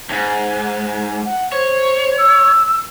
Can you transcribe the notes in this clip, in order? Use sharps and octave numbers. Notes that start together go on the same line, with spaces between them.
D2 G#2
F#5
C5 C#5
E6